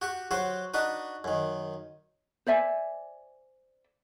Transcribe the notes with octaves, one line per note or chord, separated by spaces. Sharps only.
F#4 G4 C#6
F#3 F#4 G4 C5
D4 D#4 F#4 B4
F#2 D#3
C5 D5 E5 G#5